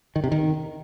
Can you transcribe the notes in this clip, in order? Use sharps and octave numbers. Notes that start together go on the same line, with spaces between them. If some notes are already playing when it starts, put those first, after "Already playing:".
D#3
C3
D#3